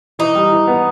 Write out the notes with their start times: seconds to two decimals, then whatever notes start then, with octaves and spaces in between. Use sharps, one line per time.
0.19 E3 D#4
0.35 G3
0.52 E3
0.68 B3